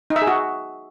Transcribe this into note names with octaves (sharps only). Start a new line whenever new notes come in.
D#4
E5
G#4
F#4